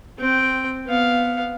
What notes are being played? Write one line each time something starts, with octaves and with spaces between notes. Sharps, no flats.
C4 G5
B3 F5